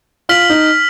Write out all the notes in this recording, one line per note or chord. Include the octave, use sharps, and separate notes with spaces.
F4 F6 B6 F#7
D#4